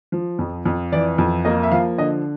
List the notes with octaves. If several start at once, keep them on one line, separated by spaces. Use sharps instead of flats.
F3
F2
F2
E3 D5
F2
A#3 D#5
E5
F3 F5
D3 D#5